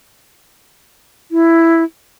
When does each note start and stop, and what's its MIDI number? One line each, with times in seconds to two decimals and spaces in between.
1.31 1.83 64